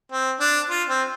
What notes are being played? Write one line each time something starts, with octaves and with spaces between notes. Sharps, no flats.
C4
D4
F4
C4